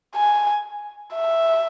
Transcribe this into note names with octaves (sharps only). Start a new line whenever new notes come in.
G#5
E5